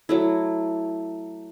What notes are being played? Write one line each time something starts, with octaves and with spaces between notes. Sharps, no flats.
F#3 A3 E4